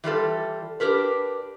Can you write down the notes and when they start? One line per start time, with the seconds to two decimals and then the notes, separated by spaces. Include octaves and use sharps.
0.04 E3 G3 F4 A4
0.80 D4 G4 A#4 B4